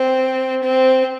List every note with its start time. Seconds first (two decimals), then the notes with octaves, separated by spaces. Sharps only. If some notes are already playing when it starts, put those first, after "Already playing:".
Already playing: C4
0.63 C4